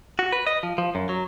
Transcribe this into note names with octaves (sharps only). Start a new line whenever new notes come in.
F#4
B4
D#5
F3
F3
F#2
F#3